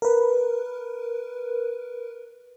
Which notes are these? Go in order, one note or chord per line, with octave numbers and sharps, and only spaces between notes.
A#4 B4